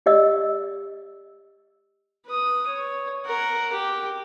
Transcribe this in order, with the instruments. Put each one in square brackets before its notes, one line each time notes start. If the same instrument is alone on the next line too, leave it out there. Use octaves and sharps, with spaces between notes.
[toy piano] G4 D5 D#5 E6
[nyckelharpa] B4 D#6
C#5
A#4 F#5
G4